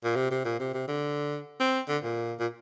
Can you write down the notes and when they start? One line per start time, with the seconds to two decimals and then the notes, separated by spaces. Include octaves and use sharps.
0.05 A#2
0.16 C3
0.31 C3
0.45 A#2
0.60 C3
0.74 C3
0.88 D3
1.60 C4
1.88 D3
2.04 A#2
2.40 A#2